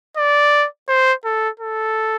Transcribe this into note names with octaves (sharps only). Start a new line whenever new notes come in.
D5
C5
A4
A4